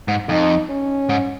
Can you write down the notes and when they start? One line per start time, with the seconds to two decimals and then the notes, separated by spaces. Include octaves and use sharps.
0.08 G#2
0.29 F2 D#4
0.70 C#4
1.09 G#2